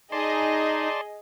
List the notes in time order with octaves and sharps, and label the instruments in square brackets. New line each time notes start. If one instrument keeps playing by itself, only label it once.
[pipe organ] D#4 [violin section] G#4 D#5 [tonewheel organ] D5 A5 C6